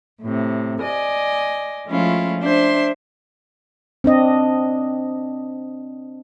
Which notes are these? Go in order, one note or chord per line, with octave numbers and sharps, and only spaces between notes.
A2 C3
D5 D#5 G#5
F3 G#3 A3 C#4 E4 F4
D4 C5 E5 C6
C4 D4 D#5